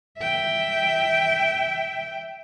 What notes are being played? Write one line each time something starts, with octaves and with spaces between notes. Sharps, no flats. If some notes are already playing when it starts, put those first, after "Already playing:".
E5 G5